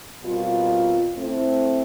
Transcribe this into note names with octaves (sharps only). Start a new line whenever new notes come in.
B2 G3 C4 F4 A#4
A3 C4 E4